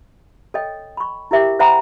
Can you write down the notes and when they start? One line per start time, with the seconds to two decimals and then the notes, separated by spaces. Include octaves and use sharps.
0.54 A4 C#5 D#5 G5
0.97 B5 C#6
1.31 E4 G4 A#4 E5 G5 D6
1.59 C5 E5 F#5 G5 A#5 B5